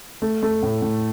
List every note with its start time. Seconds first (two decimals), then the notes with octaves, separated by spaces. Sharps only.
0.22 A3
0.43 A3
0.63 A2
0.82 A2